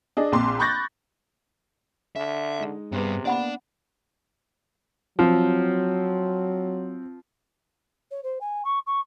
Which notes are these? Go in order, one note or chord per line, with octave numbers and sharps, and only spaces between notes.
D4 G#4 D#5
A#1 C4 C6 D6
B5 C#6 F#6 G6 A6 A#6
D3 E5
G#3 D#4
G2 C3 B3 G#4 B4
A#3 B3 D4 E4 D5 F#5 B5
F3 F#3 C4
C#5
C5
G#5
C#6
C#6